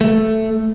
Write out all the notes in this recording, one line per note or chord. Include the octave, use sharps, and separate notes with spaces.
A3